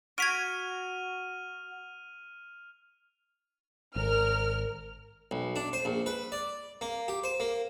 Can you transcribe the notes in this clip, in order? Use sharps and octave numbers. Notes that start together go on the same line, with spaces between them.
F#4 F6 G#6 B6 D7 D#7 F7
G#1 A#4 F6
B1
D4
C5
A#1
B4
D5
A#3
G4
C5
A#3